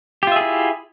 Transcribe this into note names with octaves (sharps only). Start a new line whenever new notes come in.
E4 F4 G4 G#4 E5